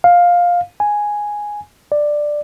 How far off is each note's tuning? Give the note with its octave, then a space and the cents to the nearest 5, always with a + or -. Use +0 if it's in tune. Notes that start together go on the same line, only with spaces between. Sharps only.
F5 +10
G#5 +0
D5 +10